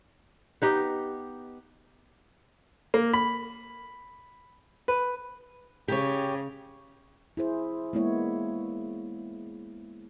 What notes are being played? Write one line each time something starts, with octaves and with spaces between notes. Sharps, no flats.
B3 D#4 G4
A#3
B5
B4
C#3 G4 C#5
E4 G#4 C5
G#3 A#3 B3 E4 C#5